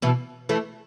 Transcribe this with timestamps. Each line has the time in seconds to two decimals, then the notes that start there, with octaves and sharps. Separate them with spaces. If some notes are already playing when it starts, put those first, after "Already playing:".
0.02 B2 E3
0.49 E3 A3